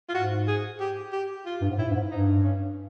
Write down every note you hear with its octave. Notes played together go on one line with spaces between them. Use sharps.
F4
G#2 F#4
G#4
G4
G4
F4
G2
G#2
A2 E4
G2
G#2
G2 D#4
C#4